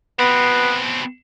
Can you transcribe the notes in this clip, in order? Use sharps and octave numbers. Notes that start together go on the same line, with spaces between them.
B2 B3 C4